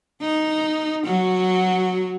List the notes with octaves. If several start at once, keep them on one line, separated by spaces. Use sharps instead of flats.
D#4
F#3 F#4